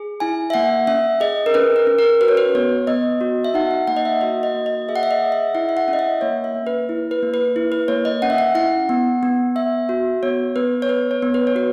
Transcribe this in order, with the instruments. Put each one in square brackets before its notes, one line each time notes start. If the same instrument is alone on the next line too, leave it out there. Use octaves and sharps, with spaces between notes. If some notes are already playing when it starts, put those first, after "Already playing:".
Already playing: [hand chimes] G#4
E4 G#5
E5
A#3 F#5
C#4 E5
G#4 D#5
A#4
C#4 B4
A#4
C#4
A#4
F#4 B4
C#5
B4
B3 C#5
B3 D#5
F#4
E5
D#4 F#5
F#5
A#3 F#5
D#5
E5
F#4 D#5
D#5
A#3
D#5
G#4 E5
F#5
E5
D#5
G#4
E5
E4 F#5
E5
F#5
C#4
D#5
E5
A#3 C#5
E5
A#3
B4
E4
B4
A#3
B4
E4
B4
A#3 C#5
D#5
C#4 F#5
E5
F#5
E4 F#5
B3
B3
B3 E5
F#4
B3 C#5
B3 B4
C#5
B3 B4
C#5
B3
B4
C#5
F#4 B4